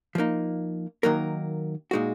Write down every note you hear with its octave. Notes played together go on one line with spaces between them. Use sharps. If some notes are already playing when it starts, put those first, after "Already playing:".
F3 A#3 D#4
D#3 F#3 A#3 D#4 A#4
A#2 G#3 D#4 F#4